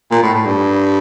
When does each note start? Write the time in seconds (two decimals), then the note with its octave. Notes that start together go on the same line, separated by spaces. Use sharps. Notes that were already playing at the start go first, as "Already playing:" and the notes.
0.11 A#2
0.23 A2
0.34 A2
0.46 G2